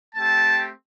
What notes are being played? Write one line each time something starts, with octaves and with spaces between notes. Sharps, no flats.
A3 C4 G4 A5